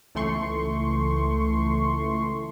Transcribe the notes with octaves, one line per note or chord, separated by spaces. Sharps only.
C#2 E3 A3 C6 C#6